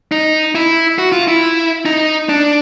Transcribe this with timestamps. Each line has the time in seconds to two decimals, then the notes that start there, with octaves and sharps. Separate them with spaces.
0.12 D#4
0.55 E4
0.98 F#4
1.12 F4
1.28 E4
1.86 D#4
2.29 D4